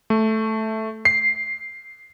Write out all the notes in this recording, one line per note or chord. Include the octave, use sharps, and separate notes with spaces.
A3
C7